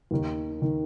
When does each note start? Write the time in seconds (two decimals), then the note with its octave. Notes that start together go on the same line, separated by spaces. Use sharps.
0.11 D#2 D#3
0.62 D#3